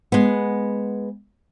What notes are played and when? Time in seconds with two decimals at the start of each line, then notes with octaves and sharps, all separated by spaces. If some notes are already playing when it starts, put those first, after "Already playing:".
0.12 G#3 B3